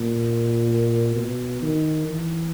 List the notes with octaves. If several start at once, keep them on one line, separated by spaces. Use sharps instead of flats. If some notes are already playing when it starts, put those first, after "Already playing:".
Already playing: A#2
B2
D#3
E3